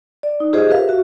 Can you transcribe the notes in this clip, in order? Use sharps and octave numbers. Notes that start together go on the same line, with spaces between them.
D5
D#4
F4 G4 G#4 C5 D#5
G4 A#4 B4 E5 F5
F#4 E5